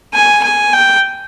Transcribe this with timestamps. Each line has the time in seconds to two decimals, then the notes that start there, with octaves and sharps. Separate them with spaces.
0.15 G#5
0.43 G#5
0.73 G5